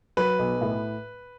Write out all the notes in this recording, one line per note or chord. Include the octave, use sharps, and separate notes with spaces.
F#3 B4
B1
A2